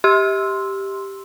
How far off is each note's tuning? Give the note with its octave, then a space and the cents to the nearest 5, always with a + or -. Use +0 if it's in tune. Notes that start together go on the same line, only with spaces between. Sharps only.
G4 +0 C6 +0 E6 +0